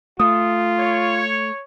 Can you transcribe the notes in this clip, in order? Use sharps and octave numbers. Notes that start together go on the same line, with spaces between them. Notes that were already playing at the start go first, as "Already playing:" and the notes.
A3 F4 D#6
C#5